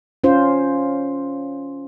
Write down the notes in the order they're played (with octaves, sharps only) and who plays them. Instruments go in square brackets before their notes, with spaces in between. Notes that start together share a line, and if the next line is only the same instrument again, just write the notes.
[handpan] C#4 F4 C5